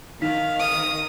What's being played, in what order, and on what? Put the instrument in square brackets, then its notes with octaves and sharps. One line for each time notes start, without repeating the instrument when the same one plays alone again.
[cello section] D#3 [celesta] D#4 B6 [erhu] F5
[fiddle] D#6